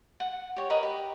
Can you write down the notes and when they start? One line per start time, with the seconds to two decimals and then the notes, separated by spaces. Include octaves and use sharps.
0.20 F#5
0.56 G4 C#5
0.70 A#4 B4 D#5 B5
0.83 G4